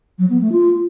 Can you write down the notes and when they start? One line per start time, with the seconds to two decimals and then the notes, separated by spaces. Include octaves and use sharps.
0.19 F#3
0.30 B3
0.41 A3
0.52 F4